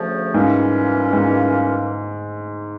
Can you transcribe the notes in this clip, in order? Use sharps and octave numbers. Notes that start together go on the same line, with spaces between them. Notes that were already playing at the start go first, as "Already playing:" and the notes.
Already playing: D2 C#3 F3 A3
G#2 E3 G3 A#3 C#4 F4
G#2